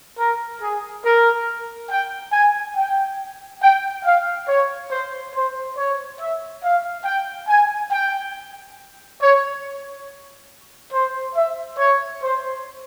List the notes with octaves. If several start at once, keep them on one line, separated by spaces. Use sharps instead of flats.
A#4
G#4
A#4
G5
G#5
G5
G5
F5
C#5
C5
C5
C#5
E5
F5
G5
G#5
G5
C#5
C5
E5
C#5
C5